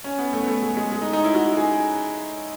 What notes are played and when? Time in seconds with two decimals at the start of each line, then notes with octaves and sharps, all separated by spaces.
0.04 C#4
0.19 B3
0.33 A3
0.43 B3
0.48 A3
0.63 G#3
0.77 G#3
0.92 G#3
1.02 D#4
1.13 D#4
1.24 E4
1.35 F#4
1.57 G#4